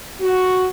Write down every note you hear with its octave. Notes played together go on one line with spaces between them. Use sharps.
F#4